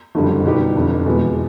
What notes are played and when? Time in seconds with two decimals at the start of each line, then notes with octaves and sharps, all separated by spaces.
0.15 F#1 F2 D3 G3
0.45 B2 G3 B3 D#4 G4
0.75 F1 F2 D3
1.05 E2 B2 G#3 B3